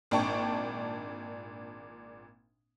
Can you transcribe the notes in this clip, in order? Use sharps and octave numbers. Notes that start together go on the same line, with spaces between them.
G#1 A#2 D4 G5 A5 C#6